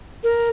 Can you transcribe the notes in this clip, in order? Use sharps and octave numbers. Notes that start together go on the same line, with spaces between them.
A#4